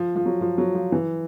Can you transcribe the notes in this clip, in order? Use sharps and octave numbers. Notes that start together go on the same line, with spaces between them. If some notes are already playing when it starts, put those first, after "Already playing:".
Already playing: F3
F3
F#3
F3
F#3
F3
E3